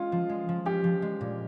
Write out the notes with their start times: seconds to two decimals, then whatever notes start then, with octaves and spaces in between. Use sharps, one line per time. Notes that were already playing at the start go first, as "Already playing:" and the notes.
Already playing: G#3 C#4 F4
0.12 F3
0.29 G#3
0.49 F3
0.66 C#4 G4
0.84 F3
1.02 G#3
1.21 A#2